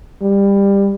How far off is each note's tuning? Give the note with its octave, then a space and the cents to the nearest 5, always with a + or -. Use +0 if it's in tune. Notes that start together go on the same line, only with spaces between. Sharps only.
G3 +20